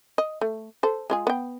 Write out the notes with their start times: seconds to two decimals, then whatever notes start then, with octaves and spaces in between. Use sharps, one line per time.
0.18 D#5
0.41 A3
0.83 A4 C5
1.10 G#3 F4 G#4
1.27 B3 G5